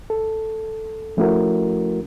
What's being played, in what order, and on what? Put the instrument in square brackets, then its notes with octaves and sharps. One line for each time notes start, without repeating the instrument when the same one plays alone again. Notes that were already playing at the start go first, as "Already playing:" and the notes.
[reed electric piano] A4
F3 A3 C#4 E4 F#4 A#4